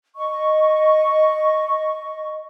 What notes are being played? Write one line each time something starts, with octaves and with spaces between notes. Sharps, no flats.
D#5 C#6